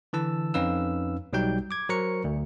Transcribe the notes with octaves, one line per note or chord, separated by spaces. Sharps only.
D3 E3 A5 E6
F2 C#4 D#4 B4 F5 E6
B1 F#3 G3 D#4 G5 G6
D6 G#6
F#3 A#4 C5 A#5 C#6 C#7
D2